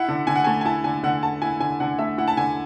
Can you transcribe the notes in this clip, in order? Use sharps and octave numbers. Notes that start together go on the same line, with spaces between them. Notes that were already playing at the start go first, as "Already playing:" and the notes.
Already playing: E4 F#5
D3
D3 G#5
F#5
A3 G#5
G#5
E4 A5
D3 G#5
D3 F#5
A3 A5
E4 G#5
D3 G#5
D3 F#5
A3 E5
E4 F#5
A5
D3 G#5